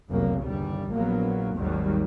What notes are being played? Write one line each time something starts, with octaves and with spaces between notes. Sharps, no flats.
F1 C2 F#2 C#3 A#3
G1 D#2 G3
A#1 F#3 A#3 B3
G#1 D#2 D#3 F#3 G3